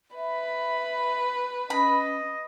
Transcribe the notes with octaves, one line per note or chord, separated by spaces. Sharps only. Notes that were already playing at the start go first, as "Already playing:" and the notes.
B4 E5 B5
C#4 D#5 B5